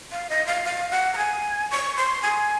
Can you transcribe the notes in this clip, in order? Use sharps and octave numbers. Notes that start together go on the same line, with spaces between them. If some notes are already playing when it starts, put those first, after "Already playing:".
F5
D#5
F5
F5
F#5
A#5
G#5
C#6
C6
G#5